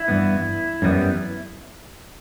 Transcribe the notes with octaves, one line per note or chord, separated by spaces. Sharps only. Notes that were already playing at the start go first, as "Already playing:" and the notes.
Already playing: E4
G2 E3 B3
F#2 E3 G3 B3